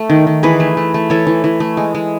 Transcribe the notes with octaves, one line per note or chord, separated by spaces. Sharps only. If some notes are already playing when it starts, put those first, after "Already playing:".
Already playing: A3
D#3
D#3
E3 G#4 B4
A3
A3
A3
E3 A4 C#5
E3
E3
A3
G#3
G#3